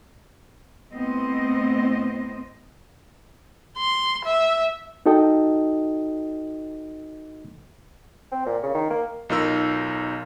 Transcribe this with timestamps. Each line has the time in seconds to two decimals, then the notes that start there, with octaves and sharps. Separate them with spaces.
0.93 A2 B3 C4 C5 D#5
3.78 C6
4.25 E5
5.06 D#4 F#4 A4 D#5 G5
8.32 C4
8.46 A#2
8.63 C#3
8.74 D#3
8.90 A#3
9.29 B1 D#4 F4 A#4 E6